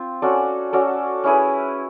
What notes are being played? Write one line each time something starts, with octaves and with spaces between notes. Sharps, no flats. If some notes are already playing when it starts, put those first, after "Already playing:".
Already playing: C4 F4
C#4 F#4 A4 D5
C#4 F#4 A4 D5
C#4 E4 G#4 B4